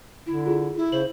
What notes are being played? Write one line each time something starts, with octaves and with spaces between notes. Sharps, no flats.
D3 E4
F4 G#4
E4
C#3 C5 F#7